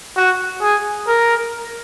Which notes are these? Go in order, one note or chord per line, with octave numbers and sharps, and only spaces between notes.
F#4
G#4
A#4